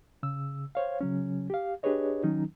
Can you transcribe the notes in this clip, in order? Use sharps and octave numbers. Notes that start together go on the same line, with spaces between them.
C#3 E6
C5 C#5 F5
C#3 F#3 C#4
G4 F5
D4 G4 G#4 B4 C#5 D#5
D#3 F#3 C#4 D#4